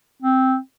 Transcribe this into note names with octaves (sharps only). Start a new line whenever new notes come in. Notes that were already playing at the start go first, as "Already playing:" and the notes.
C4